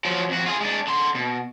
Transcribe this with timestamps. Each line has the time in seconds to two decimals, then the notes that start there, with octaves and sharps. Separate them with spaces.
0.05 F3 F#3
0.29 F2 F#4
0.46 F4 G#4
0.61 G#3 D4
0.87 D3 C6
1.15 B2